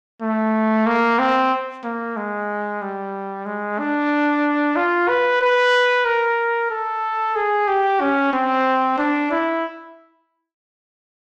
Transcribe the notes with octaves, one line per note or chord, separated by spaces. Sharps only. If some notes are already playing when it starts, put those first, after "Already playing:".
A3
A#3
C4
A#3
G#3
G3
G#3
D4
F4
B4
B4
A#4
A4
G#4
G4
C#4
C4
D4
E4